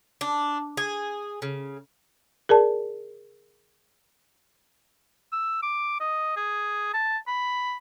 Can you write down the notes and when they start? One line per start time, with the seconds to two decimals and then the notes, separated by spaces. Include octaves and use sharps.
0.21 D4
0.77 G#4
1.42 C#3
2.49 G#4 A#4 D5 A5
5.32 E6
5.62 D6
6.00 D#5
6.37 G#4
6.93 A5
7.27 B5